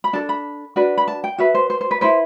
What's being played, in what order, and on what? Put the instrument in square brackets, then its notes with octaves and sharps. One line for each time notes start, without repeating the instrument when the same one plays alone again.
[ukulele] B5
D4 A4 A5
B5
D4 F#4 B4
B5
A5
G5
F#4 B4 E5
C5
C5
C5
B4
E4 B4 C5